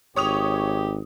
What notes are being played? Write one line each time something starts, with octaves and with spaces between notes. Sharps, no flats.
G#1 G4 C#5 D#6 F7